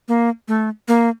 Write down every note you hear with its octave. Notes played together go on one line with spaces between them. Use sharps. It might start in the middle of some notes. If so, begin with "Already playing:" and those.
A#3
A3
A#3